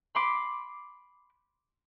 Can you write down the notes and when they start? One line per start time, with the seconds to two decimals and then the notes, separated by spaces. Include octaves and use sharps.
0.15 B5 C6 D6